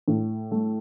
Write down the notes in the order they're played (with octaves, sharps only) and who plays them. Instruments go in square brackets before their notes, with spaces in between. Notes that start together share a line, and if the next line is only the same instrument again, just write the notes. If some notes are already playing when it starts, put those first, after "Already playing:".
[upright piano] A2
A3